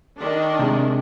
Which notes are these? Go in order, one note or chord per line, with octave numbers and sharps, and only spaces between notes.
D#3 D4
C3 G#3